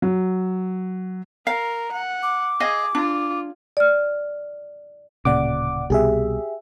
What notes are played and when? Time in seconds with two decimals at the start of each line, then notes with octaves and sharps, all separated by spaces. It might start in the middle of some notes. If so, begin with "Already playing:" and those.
0.02 F#3
1.47 A#4 F5 A#5
1.91 F#5
2.23 D6
2.60 G#4 D#5 F5
2.95 D4 F4
3.77 D5 F6
5.25 D1 A#2 C#3 D5 F#5 D6
5.90 C2 B2 G4 G#4 E5